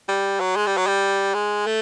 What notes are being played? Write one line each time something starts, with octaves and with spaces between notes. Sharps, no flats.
G3
F#3
G#3
G3
F#3
G3
G#3
A3